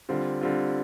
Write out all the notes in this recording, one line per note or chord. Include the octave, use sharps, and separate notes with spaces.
D3 G3 C4 F4
D3 G3 C4 F4